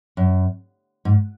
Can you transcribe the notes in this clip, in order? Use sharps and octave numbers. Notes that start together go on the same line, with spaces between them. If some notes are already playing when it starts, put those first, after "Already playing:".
F#2
G#2